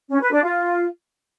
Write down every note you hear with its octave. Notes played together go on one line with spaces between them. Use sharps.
C#4
B4
D4
F4